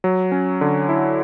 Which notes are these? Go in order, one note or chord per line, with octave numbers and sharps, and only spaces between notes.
F#3
C#4
D3
E4